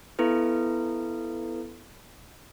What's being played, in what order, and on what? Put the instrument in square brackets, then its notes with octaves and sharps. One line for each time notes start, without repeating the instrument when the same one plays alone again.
[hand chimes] B3 E4 A4 B4